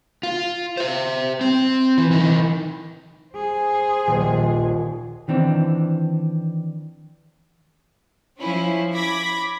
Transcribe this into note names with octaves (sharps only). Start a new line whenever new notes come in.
F4
C5 E5
C4
E3
E3 D#4
G#4 C5
D#1 A#1
D#3 E3 C4 D4
F3 C#4 E4
B5 D6 G#6 A#6 B6